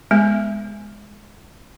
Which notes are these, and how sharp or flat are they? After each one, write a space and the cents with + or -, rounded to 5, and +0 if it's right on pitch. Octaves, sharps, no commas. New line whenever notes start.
G#3 +0 B3 +0 G#5 +5